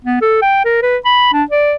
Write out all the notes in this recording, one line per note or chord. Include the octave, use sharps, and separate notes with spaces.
B3
A4
G5
A#4
B4
B5
D4
D5